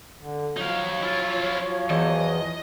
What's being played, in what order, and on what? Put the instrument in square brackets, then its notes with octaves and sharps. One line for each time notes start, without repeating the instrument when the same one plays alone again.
[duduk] D3
[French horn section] F3 F#3 [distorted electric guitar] D#4 F5 [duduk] C#5
[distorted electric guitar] E4 F4
[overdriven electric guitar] E2 [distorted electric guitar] D#5